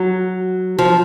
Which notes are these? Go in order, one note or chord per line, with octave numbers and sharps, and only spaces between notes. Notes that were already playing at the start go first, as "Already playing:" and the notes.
Already playing: F#3
F3